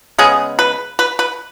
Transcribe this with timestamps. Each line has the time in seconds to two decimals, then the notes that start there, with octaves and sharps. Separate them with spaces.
0.18 C#3 G#3 B3 G#4
0.59 B4
0.99 B4
1.19 B4